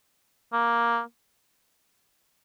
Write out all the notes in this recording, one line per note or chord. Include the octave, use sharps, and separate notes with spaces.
A#3